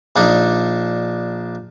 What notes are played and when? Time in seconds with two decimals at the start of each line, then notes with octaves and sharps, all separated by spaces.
0.16 A#1 D4 D#4